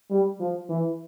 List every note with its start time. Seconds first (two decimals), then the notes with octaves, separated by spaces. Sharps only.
0.11 G3
0.40 F3
0.69 E3